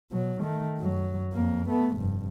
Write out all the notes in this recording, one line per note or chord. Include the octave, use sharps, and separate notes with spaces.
B2 F#3
D#3 A3
F#2 F#3
F2 A#3
A3 B3
F1 G2